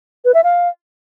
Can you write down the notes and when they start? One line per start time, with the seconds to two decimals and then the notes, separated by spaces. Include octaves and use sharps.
0.25 B4
0.34 E5
0.44 F5